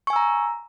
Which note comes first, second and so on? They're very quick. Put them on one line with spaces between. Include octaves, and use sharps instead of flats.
C#6 G#5 E6 A#5